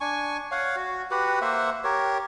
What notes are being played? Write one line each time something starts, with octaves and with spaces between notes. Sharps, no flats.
D4 G#5 C#6
C#5 F5 F#5
F#4
F#4 G4 B4 F#5
A#3 C5 E5 F#5
G4 A#4 C#5